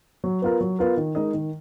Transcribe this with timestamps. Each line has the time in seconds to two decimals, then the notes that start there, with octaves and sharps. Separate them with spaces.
0.24 F#3
0.42 B3 F4 A#4
0.61 F#3
0.79 B3 F4 A#4
0.97 D#3
1.15 G#3 D#4 A#4 D#5
1.34 D#3